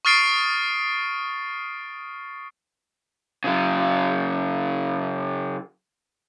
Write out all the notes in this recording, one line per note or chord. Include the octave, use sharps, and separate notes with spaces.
C#6 D#6 F6 A6 C7 D7
C#3 F#3